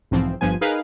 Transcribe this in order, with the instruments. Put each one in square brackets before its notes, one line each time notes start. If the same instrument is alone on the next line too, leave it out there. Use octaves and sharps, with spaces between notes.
[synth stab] B1 G#2 E3 F3 C4
G1 G2 F3 B3 G#5
D#4 G#4 A#4 B4 F5